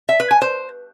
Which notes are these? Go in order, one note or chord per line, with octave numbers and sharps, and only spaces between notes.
E5
B4
G#5
C5